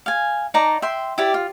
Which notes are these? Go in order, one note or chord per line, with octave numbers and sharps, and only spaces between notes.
F5 G#5
D#4 D5 A5 A#5
E5 G5 C6
E4 G4 D5
F4